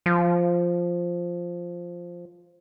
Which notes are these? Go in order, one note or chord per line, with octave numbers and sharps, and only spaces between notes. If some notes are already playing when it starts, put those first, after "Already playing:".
F3